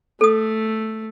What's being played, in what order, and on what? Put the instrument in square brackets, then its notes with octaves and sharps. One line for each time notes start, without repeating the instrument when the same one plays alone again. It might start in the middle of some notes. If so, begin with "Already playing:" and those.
[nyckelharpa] A3 [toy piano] A4 D#6